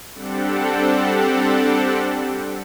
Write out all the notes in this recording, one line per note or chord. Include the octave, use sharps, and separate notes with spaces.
G3 C4 D4 G4 A4 F#5